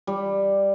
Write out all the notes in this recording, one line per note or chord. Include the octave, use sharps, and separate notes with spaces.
G3